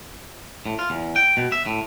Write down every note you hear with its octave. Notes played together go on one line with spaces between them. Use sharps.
A2
F4
E2
G5
B2
E5
A2